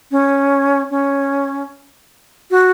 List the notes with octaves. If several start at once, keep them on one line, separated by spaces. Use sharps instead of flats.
C#4
C#4
F#4